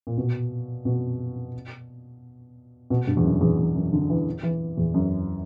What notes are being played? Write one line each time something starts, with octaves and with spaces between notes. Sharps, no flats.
A#2
B2
B2
B2
G2
E2
F#2
E2
E2
F#2
D3
E3
E3
E2
F#2